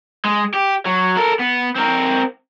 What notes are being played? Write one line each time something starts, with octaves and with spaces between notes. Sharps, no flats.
G#3
G4
F#3
A4 A#4
B3
C4 A#4